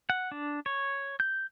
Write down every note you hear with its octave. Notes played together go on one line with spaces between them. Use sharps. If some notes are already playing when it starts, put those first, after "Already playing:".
F#5
D4
C#5
G6